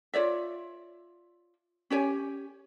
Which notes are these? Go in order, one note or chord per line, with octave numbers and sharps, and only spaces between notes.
F4 C#5 D5 E5
C#4 G4 C#5 G#5